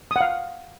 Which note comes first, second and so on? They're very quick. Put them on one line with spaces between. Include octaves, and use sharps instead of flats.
D#6 F#5 F5